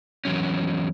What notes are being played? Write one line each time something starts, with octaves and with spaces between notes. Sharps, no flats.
E2 B2 F#3 C#4